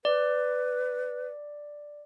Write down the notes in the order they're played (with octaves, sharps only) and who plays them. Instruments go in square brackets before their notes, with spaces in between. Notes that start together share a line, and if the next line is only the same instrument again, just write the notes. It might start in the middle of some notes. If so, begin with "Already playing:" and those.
[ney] B4 [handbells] D5